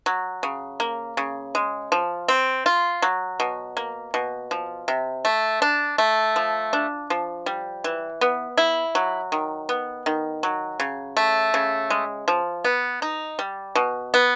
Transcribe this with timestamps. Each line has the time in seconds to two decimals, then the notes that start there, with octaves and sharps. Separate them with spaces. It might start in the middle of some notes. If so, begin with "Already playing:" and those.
0.06 F#3
0.43 C#3
0.80 A#3
1.17 C#3
1.55 G#3
1.92 F3
2.28 C4
2.66 F4
3.02 F#3
3.40 B2
3.77 A#3
4.14 B2
4.51 F3
4.88 C3
5.25 A3
5.62 D4
5.98 A3
6.36 F3
6.73 D4
7.10 F3
7.46 G3
7.84 E3
8.21 B3
8.58 E4
8.95 F#3
9.32 D#3
9.69 B3
10.06 D#3
10.43 F#3
10.80 C#3
11.17 A3
11.54 C#3
11.90 G#3
12.28 F3
12.65 B3
13.02 D#4
13.39 G3
13.75 B2
14.14 B3